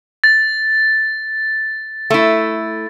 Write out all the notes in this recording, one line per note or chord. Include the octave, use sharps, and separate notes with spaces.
A6
A3 E4